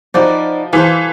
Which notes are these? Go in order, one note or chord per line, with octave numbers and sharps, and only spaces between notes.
F3 D#4 F#4 B4 D5
E3 A4 C5 F5